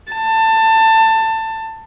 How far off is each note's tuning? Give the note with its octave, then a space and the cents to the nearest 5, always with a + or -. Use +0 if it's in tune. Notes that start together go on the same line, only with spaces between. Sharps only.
A5 +20